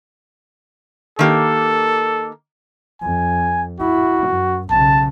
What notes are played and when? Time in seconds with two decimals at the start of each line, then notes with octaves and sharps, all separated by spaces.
1.19 D#3 A#3 G4 A4
3.02 F2 G#5
3.80 E4 F#4
4.28 F#2
4.70 B1 C#3 A5